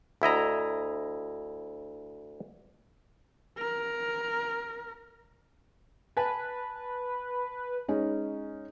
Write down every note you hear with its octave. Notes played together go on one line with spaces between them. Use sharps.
D2 E4 D#5 A#5
A#4
B4 G#5 A5
G#3 C#4 D#4